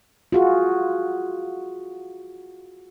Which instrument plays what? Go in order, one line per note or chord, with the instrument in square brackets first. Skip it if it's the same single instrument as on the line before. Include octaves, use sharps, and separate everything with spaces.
[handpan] F4 F#4 G#4